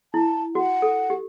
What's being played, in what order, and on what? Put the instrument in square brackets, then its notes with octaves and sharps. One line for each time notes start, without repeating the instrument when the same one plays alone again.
[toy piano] E4 [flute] A5
[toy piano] F#4 [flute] F#5
[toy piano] A4
G4